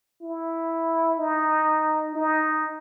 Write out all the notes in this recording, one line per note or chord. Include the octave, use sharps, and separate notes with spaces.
E4
D#4
D#4